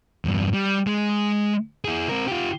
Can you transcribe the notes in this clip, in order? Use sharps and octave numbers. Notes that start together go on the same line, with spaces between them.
E2 G2
G3
G#3
E4 G#4
C4 A#4
F4 G4